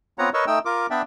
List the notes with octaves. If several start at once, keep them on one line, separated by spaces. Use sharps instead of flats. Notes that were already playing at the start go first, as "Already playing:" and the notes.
B3 C4 F4 C#5 F#5 A#5
A#4 B4 C#5 D#5 C#6 E6
A3 D#4 G5 E6
F4 A#4 D6
B3 D4 D5 E5 G5